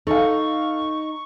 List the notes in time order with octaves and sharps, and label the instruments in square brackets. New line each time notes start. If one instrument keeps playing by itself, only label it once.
[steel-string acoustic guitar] D#4 [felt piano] A4 F5 [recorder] C#6